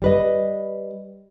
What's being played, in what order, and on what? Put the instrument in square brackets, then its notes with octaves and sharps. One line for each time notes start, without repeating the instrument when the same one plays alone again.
[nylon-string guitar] G3 B4 D#5